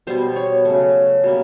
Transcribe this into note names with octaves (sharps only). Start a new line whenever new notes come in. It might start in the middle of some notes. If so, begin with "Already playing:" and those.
B2 G3 B3 C5
C#5
C#3 F#3 A3
B2 G3 A#3